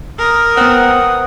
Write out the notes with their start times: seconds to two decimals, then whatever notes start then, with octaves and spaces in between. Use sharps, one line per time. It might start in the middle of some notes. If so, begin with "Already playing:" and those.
0.19 A#4 D#6
0.57 B3 C4 F#5